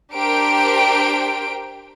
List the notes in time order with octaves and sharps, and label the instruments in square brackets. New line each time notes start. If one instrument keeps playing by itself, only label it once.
[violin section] D4 G4 A#4 C5 G5 D7